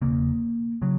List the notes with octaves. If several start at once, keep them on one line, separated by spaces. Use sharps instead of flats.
E1 D#2 C#3 A#3
C#3 F#3